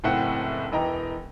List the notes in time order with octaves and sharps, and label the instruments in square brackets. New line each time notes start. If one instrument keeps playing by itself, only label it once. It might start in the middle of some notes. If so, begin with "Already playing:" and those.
[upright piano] F#1 A2 C4 E5 F#5
E1 E3 D#5 G5 A#5